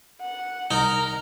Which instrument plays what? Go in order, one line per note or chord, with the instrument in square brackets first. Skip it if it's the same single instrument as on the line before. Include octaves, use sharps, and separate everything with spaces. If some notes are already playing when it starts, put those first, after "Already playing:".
[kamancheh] F#5
[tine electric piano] C2 [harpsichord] D#4 [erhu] A#4